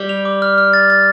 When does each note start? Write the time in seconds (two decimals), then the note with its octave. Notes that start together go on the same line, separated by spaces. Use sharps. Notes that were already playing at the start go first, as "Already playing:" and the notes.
Already playing: G3
0.09 F7
0.25 D6
0.42 F6
0.58 F6
0.73 A6
0.90 A6